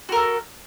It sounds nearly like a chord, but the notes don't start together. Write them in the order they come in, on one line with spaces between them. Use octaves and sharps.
F#4 A#4 A4